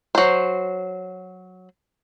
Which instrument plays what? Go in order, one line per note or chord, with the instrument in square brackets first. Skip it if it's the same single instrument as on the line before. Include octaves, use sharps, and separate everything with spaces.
[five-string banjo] F#3 C5